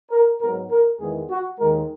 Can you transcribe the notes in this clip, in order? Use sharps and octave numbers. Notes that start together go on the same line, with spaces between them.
A#4
G#2 F#3 B3 A#4
A#4
E2 D#3 G#3 B3 G#4
F#4
D#2 D#3 G#3 A#4